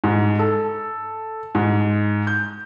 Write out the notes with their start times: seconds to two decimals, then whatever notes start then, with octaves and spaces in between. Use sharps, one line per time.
0.04 G#2
0.39 A4
1.55 G#2
2.27 G6